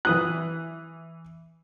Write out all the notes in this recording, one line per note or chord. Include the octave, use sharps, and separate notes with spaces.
E3 D#6 F#6